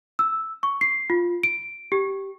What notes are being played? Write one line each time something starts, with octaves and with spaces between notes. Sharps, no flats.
E6
C#6
C7
F4
D7
G4